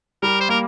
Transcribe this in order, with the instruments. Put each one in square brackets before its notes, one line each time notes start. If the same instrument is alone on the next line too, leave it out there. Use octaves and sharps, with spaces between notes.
[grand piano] G3 [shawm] A#4
[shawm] C5
[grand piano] A#3 [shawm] A#4